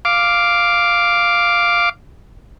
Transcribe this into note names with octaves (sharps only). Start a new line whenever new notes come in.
F5 D6